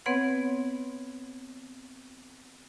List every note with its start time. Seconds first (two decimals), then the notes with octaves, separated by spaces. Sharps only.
0.06 B3 C4 B4 C#5 F#5 G#6